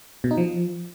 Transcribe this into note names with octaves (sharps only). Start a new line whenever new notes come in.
B2
D#4
F3